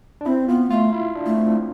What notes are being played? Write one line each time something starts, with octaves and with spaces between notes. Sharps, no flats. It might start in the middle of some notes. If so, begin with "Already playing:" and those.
D4
C4 E4
B3 F4
A3 F4
E4
D4
A3
C4